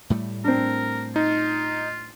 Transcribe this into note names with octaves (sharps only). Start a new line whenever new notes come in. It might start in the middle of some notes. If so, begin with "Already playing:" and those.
A2 G3 A3
C4 D4 A#4
D#4 F4